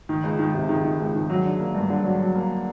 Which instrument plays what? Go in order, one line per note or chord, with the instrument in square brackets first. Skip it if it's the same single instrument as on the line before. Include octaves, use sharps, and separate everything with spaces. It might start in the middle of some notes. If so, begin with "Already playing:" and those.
[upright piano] D#3
C#2
D#3
C3
D#3
D#3
C#2
D#3
F#3
D3
A#3
G2
D3
F#3
F#3
A#3